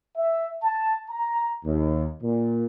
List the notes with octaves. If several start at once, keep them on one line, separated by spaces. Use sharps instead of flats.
E5
A5
A#5
D#2
A#2